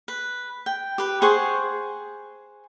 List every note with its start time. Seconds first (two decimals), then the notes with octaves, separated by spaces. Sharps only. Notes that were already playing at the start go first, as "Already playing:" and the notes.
0.08 B4
0.66 G5
0.98 G4 B4
1.22 G#4 C5 F#5 C#6